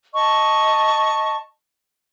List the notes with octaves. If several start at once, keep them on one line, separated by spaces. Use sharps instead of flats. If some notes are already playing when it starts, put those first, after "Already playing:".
D#5 A5 C#6